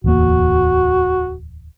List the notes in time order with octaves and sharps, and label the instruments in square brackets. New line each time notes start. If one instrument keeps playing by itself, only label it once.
[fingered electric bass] D1 E2 A#3 [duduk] F#4